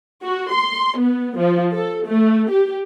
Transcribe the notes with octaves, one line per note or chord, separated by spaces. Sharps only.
F#4
C6
B3
F3
A4
A3
G4